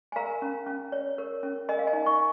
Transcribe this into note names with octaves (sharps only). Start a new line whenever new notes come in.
G#5
A#4 F5 A#5
C#4
C#4
C#5
A#4
C#4
A#4 D#5 G#5
F5
D#5 G#5
D#4
G#5 C#6